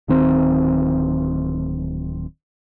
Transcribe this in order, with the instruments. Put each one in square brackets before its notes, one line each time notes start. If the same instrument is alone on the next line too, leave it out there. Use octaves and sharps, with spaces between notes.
[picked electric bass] D1 D#3 C4